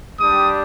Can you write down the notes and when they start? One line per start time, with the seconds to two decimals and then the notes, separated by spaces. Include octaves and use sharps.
0.20 G3 D4 G4 D#6